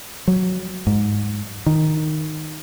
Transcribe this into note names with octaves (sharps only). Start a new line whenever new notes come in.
F#3
G#2
D#3